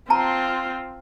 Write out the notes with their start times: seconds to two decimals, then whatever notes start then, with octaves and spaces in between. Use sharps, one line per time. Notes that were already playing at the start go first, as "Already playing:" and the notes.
0.10 C4 F4 A5 A#5